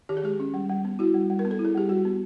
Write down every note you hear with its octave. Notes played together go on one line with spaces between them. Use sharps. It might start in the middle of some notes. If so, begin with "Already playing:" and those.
D#3 G4
G#4
G#3 G4
C#4
G3
G3
B3
E4 F#4
G3
G3
A#4
B3
A4
E4
G#4
G3 G4
G3 F#4
B3